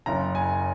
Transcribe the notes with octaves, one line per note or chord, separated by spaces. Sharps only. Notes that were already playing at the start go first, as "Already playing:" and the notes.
F#1 F#2 C#3 A#5
G#5